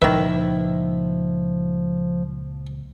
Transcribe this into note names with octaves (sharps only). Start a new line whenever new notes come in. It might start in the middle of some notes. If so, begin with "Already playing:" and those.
C#2 A#2 D#3 F3 G3 E4 B4 E5